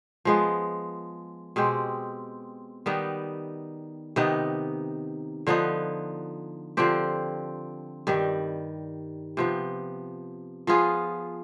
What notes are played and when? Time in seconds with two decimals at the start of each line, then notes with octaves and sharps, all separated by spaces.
0.25 F3 G#3 B3
1.56 B2 G#3 C4 G4
2.86 D#3 G3 B3 D#4
4.16 C3 D#3 B3 D#4
5.47 D3 F3 B3 D#4
6.77 D3 F3 C4 G4
8.07 G2 D#3 G3
9.37 C3 F3 B3
10.67 F3 B3 F4 G#4